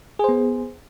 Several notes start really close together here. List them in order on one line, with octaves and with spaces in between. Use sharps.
G#4 C5 B3